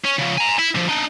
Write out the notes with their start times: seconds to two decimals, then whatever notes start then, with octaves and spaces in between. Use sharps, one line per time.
0.05 C#4
0.19 C#3 F3
0.38 G#5 A#5
0.59 E4
0.75 D3 F3
0.89 D4 D#4